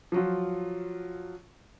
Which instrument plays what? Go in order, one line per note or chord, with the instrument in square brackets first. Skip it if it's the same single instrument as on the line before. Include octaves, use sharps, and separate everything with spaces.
[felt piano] F3 F#3 F4